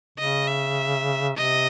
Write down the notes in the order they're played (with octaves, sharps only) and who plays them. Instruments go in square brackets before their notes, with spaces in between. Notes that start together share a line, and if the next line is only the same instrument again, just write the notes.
[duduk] C#3 [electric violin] D#5
[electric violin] E5
[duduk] C3 [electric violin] D#5